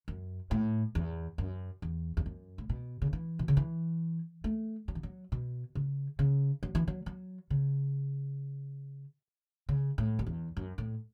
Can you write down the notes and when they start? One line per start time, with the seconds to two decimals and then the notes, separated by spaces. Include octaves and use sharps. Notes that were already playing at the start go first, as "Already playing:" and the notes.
0.08 F#2
0.51 A2
0.95 E2
1.38 F#2
1.82 E2
2.17 E2
2.26 F#2
2.58 A2
2.69 B2
3.02 C#3
3.13 E3
3.39 B2
3.48 C#3
3.57 E3
4.44 A3
4.88 F#3
4.95 E3
5.03 F#3
5.32 B2
5.75 C#3
6.19 C#3
6.63 F#3
6.75 E3
6.88 F#3
7.06 F#3
7.50 C#3
9.69 C#3
9.98 A2
10.19 F#2
10.27 E2
10.57 F#2
10.78 A2